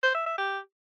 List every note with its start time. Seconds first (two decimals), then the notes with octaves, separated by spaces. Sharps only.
0.03 C5
0.15 E5
0.26 E5
0.38 G4